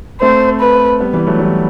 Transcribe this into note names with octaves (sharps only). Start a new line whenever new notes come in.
A3 C4 C5
B4
G3 B3
E3 G3
F#3 A3
E3 G3